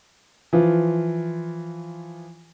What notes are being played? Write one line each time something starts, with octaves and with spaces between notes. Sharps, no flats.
E3 F3 F4